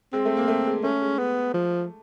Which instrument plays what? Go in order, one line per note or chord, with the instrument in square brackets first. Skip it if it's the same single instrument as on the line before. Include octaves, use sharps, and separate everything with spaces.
[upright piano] G#3 [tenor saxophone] C4
[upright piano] A3
A#3
A3
G#3
[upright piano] A3 [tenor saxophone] C#4
[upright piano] G#3
[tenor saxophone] B3
F3